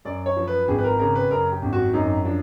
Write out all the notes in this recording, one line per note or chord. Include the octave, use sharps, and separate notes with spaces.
F#2 D5
C#5
F3
B4
G#1 G#4
B4
A#4
C#3 A#4
B4
F#2 A#4
G4
G#1
F#4
F#2 D#4
F3 D4